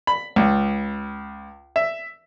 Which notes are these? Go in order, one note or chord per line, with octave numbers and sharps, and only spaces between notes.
B5
C#2
E5